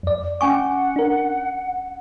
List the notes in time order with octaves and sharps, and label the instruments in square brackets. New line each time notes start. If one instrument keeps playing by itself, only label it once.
[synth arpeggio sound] F2 D5
[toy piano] C#4 G#5 C#6 [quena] F#5 [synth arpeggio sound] D6
[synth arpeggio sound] D4 A#4